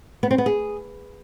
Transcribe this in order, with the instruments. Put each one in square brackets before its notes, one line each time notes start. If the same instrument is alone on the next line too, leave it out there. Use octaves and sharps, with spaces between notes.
[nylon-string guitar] B3
C4
B3
G#4